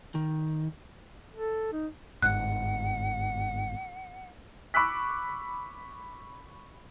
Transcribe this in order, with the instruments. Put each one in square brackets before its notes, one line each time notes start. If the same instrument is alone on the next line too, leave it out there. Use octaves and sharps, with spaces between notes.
[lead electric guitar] D#3
[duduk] A4
D#4
[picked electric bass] G1 G#2 [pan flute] F#5 [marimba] F#6
[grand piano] B5 C#6 D6 E6 F#6 B6